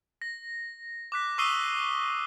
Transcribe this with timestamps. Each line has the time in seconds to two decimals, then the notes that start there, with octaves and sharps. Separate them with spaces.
0.22 A#6
1.12 D6 F#6 B6
1.38 C#6 D#6 E6 C7 D#7 G7